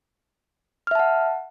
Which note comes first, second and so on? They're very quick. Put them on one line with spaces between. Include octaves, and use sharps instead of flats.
F6 E5 A5 F#5